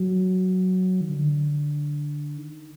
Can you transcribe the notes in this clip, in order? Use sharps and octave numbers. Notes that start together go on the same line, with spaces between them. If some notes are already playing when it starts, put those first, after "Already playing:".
Already playing: F#3
D#3
D3
D#3